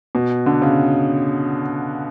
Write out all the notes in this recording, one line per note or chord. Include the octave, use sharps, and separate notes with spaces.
B2
D3
C#3